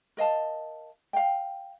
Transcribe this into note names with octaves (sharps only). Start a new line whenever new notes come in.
A#4 D#5 F5 A5
F5 G5